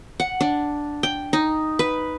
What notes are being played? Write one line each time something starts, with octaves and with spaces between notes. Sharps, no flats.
F#5
D4
G5
D#4
B4